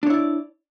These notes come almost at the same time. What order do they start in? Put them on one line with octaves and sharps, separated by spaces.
D4 C#5 E4 D5